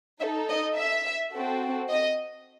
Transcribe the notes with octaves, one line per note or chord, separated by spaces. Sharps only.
D#4 A4 E5
D#5
E5
C4 F#4 A4
D#5